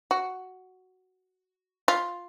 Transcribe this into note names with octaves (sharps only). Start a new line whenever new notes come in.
F#4
F4